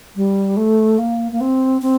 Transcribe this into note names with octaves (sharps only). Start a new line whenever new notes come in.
G3
A3
A#3
A#3
C4
C4